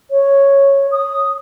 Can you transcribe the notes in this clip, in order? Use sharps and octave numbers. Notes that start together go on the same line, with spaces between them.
C#5
D#6